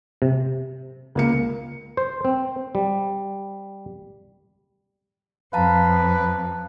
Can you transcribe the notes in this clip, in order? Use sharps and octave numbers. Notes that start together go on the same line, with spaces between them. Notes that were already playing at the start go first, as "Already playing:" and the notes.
C3
C#2 A#3 C#7
C5
C4
G3
F2 B4 F5 A5 A#5